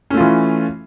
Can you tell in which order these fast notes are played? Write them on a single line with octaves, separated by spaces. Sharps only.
C#4 A3 F4 E3